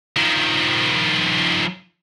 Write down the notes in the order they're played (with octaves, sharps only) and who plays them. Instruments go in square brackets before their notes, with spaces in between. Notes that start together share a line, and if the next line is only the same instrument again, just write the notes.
[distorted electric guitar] D#3 F3